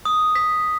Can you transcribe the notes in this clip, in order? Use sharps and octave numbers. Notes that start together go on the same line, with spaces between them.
D#6
B6